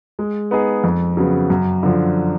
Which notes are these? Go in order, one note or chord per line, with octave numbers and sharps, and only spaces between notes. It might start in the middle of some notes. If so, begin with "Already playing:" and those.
G#3
B3 D#4 G#4
F2
C#3 F#3 B3
F#2
D3 F3